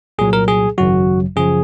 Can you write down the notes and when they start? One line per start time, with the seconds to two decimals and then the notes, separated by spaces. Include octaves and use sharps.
0.18 C2 A#2 F#3 G#4
0.33 A#4
0.48 G#4
0.78 G#1 F#2 C#3 F#3 F#4
1.36 F#2 C#3 F3 G#4